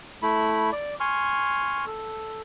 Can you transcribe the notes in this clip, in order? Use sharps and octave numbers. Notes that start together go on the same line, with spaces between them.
A3 E4 B5
D5
G#5 C6 C#6 F6
A4